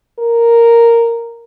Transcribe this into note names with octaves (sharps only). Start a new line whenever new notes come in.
A#4